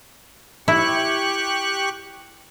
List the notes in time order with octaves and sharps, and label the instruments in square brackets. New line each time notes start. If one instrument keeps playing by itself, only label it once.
[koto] E4 [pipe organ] G4 C#6 F#6